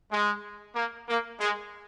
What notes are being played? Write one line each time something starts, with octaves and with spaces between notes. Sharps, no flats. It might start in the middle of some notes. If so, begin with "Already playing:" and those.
G#3
A#3
A#3
G#3